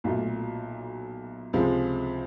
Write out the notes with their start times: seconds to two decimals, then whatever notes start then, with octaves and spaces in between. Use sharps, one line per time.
0.04 B1 A#2 F#3 A3
1.53 C#2 C3 F3 G#3